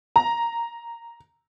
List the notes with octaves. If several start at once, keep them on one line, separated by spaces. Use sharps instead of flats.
A#5